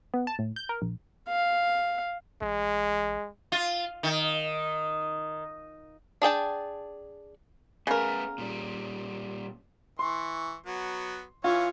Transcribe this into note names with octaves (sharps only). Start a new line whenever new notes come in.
B3
A5
A2
G6
A#4
A#1
F5
A1 G#3
F4
D#3
D4 G#4 G5 A5
C#3 A3 B3 A#4
A#2 G3
E3 C6 C#6
F#3 B3
E3 C#4 F4 C#5